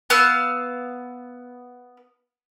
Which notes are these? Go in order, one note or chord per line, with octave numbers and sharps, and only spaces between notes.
B3 F5 E6